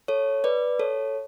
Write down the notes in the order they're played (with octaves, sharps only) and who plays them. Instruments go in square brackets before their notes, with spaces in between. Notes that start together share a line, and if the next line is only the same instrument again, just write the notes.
[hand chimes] A4 C#5
B4 D5
A4 C#5